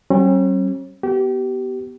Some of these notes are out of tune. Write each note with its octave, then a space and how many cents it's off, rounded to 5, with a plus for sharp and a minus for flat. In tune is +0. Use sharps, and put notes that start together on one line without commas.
G3 -45 C#4 -45
B3 +0 G4 -30